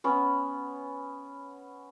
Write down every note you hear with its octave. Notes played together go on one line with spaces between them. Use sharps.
B3 C#4